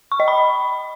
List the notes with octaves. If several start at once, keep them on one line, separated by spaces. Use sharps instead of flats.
C#6
D#5
B5